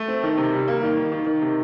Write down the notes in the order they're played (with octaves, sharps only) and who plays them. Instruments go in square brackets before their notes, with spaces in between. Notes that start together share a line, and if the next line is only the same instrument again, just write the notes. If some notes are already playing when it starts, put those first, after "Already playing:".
Already playing: [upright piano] A3
C4
D#3
C3
G3
A#3
D#3
D#3
D#3
D#3
C3